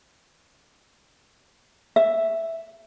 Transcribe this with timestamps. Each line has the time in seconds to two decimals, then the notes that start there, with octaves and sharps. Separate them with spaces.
1.96 E5